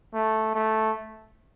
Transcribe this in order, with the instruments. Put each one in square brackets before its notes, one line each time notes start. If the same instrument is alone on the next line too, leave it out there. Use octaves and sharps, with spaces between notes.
[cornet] A3
A3